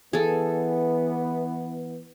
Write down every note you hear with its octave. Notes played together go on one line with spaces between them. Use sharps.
E3 B3 G#4 A4